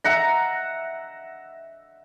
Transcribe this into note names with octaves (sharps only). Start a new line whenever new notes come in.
E5 F#5 A#5